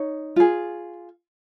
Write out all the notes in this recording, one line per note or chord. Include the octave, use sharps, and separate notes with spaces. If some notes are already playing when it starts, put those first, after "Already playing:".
Already playing: D#4 C#5
F4 G#4